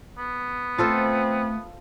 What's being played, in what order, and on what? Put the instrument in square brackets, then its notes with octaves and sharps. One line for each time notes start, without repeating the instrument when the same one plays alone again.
[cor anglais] B3
[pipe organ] A3 [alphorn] C4 [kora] F4 A4 C5